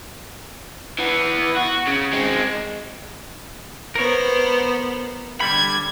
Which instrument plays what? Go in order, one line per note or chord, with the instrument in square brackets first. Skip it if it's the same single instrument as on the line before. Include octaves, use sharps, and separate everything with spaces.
[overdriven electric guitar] E3 B3
F#4
C#3
G#3 C4
[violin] B3 C5 [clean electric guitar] A#4 C#5
[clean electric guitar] D3 G3 B5 [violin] G#6